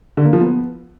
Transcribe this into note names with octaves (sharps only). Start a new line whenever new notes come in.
D3
A#3
F3
B3